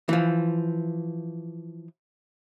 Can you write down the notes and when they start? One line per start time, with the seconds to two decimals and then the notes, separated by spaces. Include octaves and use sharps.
0.09 E3 F3